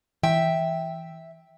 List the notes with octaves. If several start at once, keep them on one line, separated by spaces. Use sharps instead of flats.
E3 E5 G5